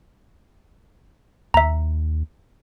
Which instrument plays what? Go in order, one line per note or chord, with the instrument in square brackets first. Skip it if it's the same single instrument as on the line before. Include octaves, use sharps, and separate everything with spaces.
[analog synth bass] D#2 [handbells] E5 A#5